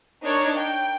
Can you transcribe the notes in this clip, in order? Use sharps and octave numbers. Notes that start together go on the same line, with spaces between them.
D4 D#4 A#4 C#5
G5